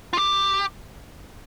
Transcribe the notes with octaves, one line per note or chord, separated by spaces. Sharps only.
F4
G4